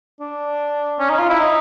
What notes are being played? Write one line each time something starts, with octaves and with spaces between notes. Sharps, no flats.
D4
C#4
D#4
F4
E4
D#4